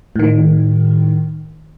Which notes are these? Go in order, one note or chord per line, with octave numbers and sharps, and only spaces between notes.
A2 D#3